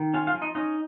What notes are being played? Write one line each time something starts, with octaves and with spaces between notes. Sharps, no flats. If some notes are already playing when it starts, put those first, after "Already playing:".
Already playing: D#3
C#4 F4 F5
F4 F5
F3
D#4 D#5
C#4 D#4 D#5